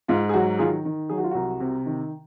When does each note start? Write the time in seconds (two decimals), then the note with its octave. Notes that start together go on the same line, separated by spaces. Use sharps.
0.08 G#2 F4
0.29 G#4
0.34 F#3 F#4
0.59 D#3 F4 G#4
0.85 D#3
1.09 F#3 G#4
1.18 F#4
1.24 F4
1.31 C2 F#4
1.60 C3
1.86 D#3